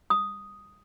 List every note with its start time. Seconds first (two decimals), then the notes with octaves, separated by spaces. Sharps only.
0.10 D#6